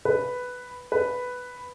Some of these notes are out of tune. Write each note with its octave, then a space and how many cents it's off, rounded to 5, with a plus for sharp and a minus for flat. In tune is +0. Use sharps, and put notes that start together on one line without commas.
B4 +5
B4 +5